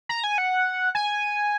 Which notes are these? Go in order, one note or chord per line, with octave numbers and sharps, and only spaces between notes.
A#5
G#5
F#5
G#5